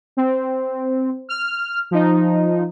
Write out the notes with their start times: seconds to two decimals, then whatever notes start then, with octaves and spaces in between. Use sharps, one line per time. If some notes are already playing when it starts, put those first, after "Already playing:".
0.17 C4
1.29 F6
1.91 F3 D#4